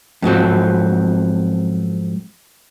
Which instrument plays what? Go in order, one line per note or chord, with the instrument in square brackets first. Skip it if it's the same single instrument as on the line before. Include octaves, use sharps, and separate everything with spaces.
[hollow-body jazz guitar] F2 G#2 F#3 C4